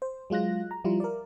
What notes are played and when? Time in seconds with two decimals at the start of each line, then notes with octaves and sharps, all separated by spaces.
0.02 C5
0.30 F#3 G#3 F4 F#6 A#6
0.71 A#5
0.84 F3 G3 E4 F4
1.00 A#4 D5